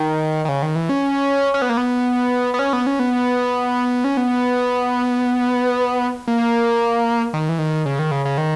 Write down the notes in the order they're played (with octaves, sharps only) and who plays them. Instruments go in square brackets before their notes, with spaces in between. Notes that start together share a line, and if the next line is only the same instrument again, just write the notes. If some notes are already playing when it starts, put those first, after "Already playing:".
Already playing: [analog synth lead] D#3
D#3
C#3
D#3
E3
C#4
C#4
B3
A#3
B3
B3
C#4
B3
C#4
B3
C#4
B3
A#3
D#3
E3
D#3
C#3
D#3
C#3
C#3
D#3